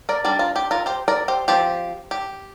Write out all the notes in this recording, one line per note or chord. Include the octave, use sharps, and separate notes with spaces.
A#4 D5
G3 D4 A#4 D5
F4 A#4
G4
F4 A#4
G4 C5
A#4 D5
G4 C5
F3 C4 G4 C5
G4